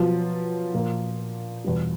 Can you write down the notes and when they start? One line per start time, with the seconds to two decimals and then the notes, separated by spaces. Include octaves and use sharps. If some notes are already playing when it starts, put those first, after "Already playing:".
Already playing: B2 F3 F#3 B3 F4
0.74 A#2 F3 A#3
1.64 E2 B2 G3